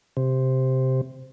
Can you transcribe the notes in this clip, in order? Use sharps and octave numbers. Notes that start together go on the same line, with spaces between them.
C3